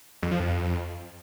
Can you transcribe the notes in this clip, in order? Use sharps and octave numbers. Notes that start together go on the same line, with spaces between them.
F2
F3
F2